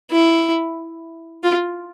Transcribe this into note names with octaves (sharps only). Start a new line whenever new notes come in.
E4
F4